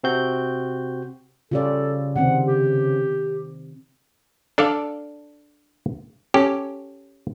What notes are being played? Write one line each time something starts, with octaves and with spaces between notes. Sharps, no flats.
C3 C4 F#4 G6
C#3 F4 G4 A4 D5
C3 D#3 C4 F#5
G4
D4 A4 D5 F5
C#4 G4 A4